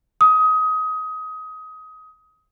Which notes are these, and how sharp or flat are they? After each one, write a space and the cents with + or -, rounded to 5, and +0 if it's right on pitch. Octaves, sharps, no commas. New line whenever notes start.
D#6 +20